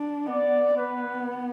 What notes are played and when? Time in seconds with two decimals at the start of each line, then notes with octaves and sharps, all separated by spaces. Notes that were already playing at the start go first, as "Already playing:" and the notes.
Already playing: D4
0.26 B3 D5
0.75 B3 B4